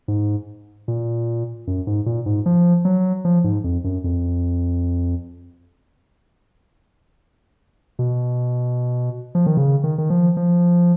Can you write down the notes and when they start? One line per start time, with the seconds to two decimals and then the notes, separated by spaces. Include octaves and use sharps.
0.08 G#2
0.88 A#2
1.67 F#2
1.87 G#2
2.06 A#2
2.26 G#2
2.46 F3
2.85 F#3
3.25 F3
3.44 G#2
3.64 F2
3.84 F#2
4.04 F2
7.99 B2
9.35 F3
9.46 D#3
9.57 C#3
9.84 D#3
9.98 D#3
10.10 F3
10.37 F3